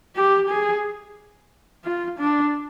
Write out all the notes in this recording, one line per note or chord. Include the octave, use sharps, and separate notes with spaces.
G4
G#4
F4
D4